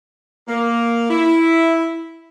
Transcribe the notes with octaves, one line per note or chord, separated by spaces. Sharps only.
A#3
E4